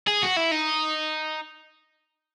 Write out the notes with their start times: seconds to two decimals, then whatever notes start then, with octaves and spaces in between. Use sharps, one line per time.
0.08 G#4
0.23 F#4
0.37 E4
0.52 D#4